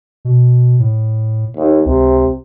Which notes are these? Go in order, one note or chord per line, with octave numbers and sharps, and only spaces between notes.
B2
A2
D#2
C#2 C3